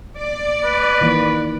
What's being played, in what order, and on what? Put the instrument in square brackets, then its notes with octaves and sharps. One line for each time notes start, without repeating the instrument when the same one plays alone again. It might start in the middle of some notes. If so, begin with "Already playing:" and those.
[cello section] D5
[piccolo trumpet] B4
[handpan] D#3 E3 A#3